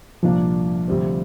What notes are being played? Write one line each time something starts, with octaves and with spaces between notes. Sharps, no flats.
C2 A#2 F3 A#3 D4
D2 C3 G3 C4